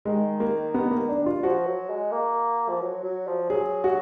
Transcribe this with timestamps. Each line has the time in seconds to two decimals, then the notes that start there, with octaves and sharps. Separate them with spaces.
0.05 D#3 G#3
0.40 A#3
0.74 B3
0.91 A#3
1.09 D4
1.26 F4
1.43 F3 F#4
1.67 F#3
1.89 G#3
2.12 A#3
2.69 F3
2.81 F#3
3.04 F#3
3.27 F3
3.50 F#3 G#4
3.84 F#4